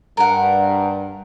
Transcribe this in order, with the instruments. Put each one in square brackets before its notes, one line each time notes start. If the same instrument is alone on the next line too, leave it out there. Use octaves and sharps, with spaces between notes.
[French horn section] G2 [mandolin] A#4 F#5